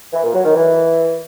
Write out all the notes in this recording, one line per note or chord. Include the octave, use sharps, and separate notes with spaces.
E3
A#2
F#3
D#3
E3